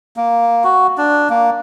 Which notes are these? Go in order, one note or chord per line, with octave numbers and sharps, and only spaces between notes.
A#3
F#4
D4
A#3